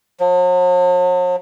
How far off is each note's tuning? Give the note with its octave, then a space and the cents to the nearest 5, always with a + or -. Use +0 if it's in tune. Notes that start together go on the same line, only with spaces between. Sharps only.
F#3 -45